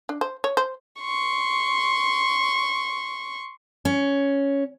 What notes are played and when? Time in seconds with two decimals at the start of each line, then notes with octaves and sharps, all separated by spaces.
0.09 D4
0.21 C5
0.44 C#5
0.57 C5
1.01 C6 C#6
3.85 C#4